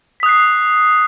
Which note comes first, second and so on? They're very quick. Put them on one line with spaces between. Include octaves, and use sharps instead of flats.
B6 D#6 F#6 C7